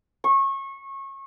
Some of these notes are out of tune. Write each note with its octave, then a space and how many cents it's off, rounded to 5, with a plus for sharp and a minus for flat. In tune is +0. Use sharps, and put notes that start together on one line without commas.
C#6 -25